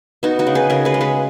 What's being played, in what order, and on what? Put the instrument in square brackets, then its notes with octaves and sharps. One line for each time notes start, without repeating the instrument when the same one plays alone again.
[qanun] B3 D#4 F#4
D#4 F#4
C#3
G#4 B4
C#3 F#4 A#4
G#4 B4
G#3
G#4 B4